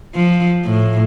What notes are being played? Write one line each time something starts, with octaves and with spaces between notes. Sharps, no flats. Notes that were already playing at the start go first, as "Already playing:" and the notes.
F3
A2